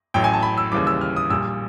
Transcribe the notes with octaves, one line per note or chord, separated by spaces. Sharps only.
A1 A2 F#3 G5
G#5
A5
B5
E6
D#2 C#3 E3 G3 D6
E6
F6
D#6
A#1 A#2 G3 E6